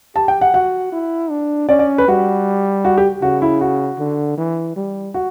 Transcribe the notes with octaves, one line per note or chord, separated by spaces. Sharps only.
G4 A5
G5
F#5
F#4 F#5
E4
D4
C#4 D5
D5
B4
G3 F#4
F#4
G4
C#3 F#4
E4
F#4
D3
E3
G3
F#4